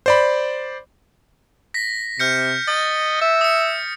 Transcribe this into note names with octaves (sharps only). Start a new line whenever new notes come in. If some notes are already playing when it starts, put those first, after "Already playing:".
C5 D5 B5
A#6 B6
C3 F6 G6 C#7
D#5 A6
E5
D#6 C#7